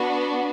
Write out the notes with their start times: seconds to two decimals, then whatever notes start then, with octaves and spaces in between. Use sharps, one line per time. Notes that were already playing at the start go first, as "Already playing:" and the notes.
Already playing: B3 D4 F#4